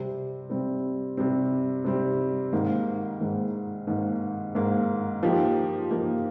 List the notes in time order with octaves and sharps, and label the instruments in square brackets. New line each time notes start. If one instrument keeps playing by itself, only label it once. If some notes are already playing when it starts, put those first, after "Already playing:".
Already playing: [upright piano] C3 G3 C4
C3 G3 C4
C3 G3 C4
C3 G3 C4
G#2 D#3 A#3
G#2 D#3 A#3
G#2 D#3 A#3
G#2 D#3 A#3
F3 A#3 D#4 G4
F3 A#3 D#4 G4